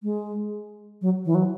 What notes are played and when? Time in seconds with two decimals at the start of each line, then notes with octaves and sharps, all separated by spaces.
0.03 G#3
1.02 F#3
1.25 E3
1.35 F#3